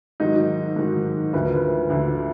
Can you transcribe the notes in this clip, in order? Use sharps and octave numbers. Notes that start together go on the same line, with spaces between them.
G#2 D#3 F#3 D#4
G#2 D#3 F#3
D2 D3 F3 B4
A#4
B4
D2 D3 F3